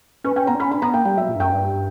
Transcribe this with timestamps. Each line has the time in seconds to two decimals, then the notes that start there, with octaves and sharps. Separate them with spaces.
0.24 C#4 B4
0.36 C#4 G5
0.47 B3 A#5
0.55 D4
0.60 C#4 B5
0.71 D4 B5
0.82 B3 A#5
0.94 A#3 G5
1.05 G3 G5
1.17 F#3 E5
1.29 A#2
1.35 G2
1.40 F#2 G5
1.52 G2